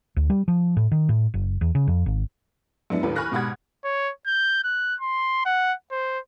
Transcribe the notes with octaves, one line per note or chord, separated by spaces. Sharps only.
D2
G3
F3
A2
D#3
A2
F#1
E2
C#3
F2
G#1
F#2 G#3 B3 D4 E4
D#2 A2 D4 G4 A#4 B4
G#5 B5 C#6 F6 F#6 A#6
G#2 B2 G4 F#5 B5 G#6
C#5
G6
F#6
C6
F#5
C5